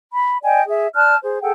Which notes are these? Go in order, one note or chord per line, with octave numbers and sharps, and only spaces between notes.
B5
D5 D#5 G5 G#5
G#4 E5
D5 A5 F6 F#6
G#4 C5
G#4 A4 F#5 G5